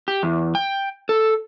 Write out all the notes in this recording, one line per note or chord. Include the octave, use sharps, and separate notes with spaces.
G4
E2
G5
A4